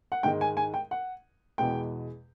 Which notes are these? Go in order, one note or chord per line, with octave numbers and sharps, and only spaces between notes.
F#5
G#2 D#3 G#3 G5
G#5
G#5
G5
F#5
E2 B2 G#3 G5